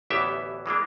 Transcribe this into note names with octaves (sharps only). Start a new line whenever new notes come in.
A1 D2 E3 B3 G4 E5
E3 G#3 A#3 D4